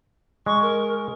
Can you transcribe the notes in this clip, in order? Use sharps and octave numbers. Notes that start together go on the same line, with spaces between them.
G#3 C#6
A#4